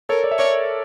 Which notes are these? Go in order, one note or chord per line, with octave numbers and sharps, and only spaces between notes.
A4 A#4 C#5
D5
E5
A#4 C#5 D5